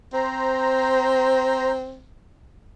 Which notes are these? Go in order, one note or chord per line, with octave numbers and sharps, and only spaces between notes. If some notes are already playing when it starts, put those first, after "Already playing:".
C4 C5 A#5